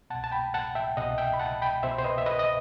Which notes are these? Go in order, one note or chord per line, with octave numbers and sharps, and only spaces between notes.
C2 B2 F#5 A5
A5
G5 B5
F#5 A5
E5 G5
C2 B2 D#5 F#5
E5 G5
B5
F#5 A5
G5 B5
C2 B2 C5 E5
C5
B4 D#5
E5
B4 D#5
D#5